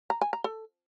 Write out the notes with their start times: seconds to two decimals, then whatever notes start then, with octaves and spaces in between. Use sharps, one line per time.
0.10 A#5
0.21 G#5
0.33 A#5
0.44 A4